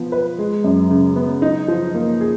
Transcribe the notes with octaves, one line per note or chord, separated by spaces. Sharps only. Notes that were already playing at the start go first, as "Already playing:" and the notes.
Already playing: F3 B3
B4
G#3
F#2
C#3
B3
D#4
F3
A#3
G#4